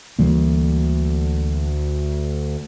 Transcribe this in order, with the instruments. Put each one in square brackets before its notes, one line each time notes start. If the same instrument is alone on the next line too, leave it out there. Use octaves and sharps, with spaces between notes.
[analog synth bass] D2 [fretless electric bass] E3 G3 A#3